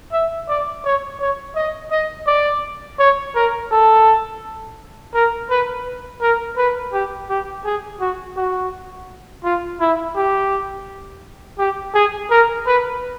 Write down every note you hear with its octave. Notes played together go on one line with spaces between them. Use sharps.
E5
D5
C#5
C#5
D#5
D#5
D5
C#5
A#4
A4
A#4
B4
A#4
B4
G4
G4
G#4
F#4
F#4
F4
E4
G4
G4
G#4
A#4
B4